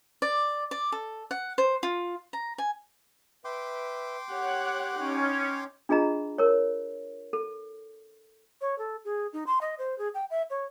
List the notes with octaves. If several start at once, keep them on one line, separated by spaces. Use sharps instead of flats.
D5
D5
A4
F#5
C5
F4
A#5
G#5
B4 E5 G5 C6 D6
G4 C#5 F#5
C#4 D#4 C#5
D4 F4 G#4 D#5 A#5
A#4 C#5
A4
C#5
A4
G#4
D#4
C6
D#5
C5
G#4
G5
E5
C#5